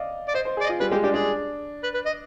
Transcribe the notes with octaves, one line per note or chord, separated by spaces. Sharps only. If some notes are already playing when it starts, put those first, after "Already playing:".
Already playing: D5 D#5 F5
D5
C5 D#5
C5
G#4 D5
D#5
F4
G3 B4
G#3 G4
D4 G4
D4 G#4
B4
B4
D#5